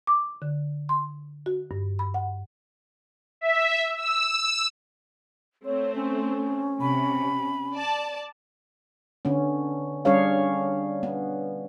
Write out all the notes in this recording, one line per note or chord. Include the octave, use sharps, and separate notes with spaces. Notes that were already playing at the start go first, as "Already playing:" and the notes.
D6
D3
C6
F#4
G2
B5
F#5
E5
E6
A3 C4 C#5
C#4
C3 B5
D5 A5
D3 B3 C#4
G3 C#4 D4 G#4 C#5 F5
B3